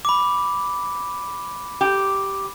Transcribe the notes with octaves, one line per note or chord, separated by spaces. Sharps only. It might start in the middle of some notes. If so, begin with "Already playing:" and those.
B5 D6
G4